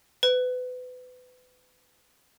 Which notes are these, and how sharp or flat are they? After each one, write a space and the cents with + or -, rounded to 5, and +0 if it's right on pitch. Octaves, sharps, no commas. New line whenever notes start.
B4 +30